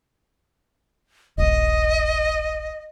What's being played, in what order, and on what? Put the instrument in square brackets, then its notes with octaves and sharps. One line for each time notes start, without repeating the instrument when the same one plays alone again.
[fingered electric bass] D#1 A#1 [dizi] D#5